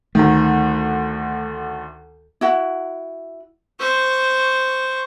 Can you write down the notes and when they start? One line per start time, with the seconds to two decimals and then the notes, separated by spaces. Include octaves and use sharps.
0.15 D2 D#3 A3
2.41 E4 F#4 F#5
3.79 C5 C#6